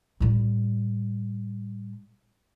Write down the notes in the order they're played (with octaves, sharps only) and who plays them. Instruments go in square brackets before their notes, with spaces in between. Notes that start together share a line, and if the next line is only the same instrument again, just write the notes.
[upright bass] A2 G3